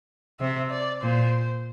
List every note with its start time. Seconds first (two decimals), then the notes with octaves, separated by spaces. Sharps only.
0.40 C3 E5
0.71 D5
1.03 A#2 C5